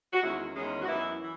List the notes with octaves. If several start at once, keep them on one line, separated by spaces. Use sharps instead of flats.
F#4
E2 D#3 G#3 C#4 E4
E2 D#3 G#3 C#4
F#4
F#2 E3 B3 E4
E3